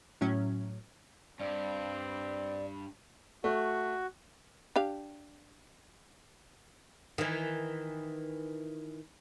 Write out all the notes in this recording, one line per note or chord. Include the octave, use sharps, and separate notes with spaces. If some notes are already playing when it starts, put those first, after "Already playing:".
A2 F#3 C#4
G2 C4 D5
A3 F#4
D4 G4 F5
D#3 E3